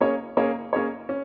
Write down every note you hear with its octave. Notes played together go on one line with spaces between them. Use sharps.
A#3 C#4 G#4 C#5
A#3 C#4 G#4 C#5
A#3 C#4 G#4 C#5
C#4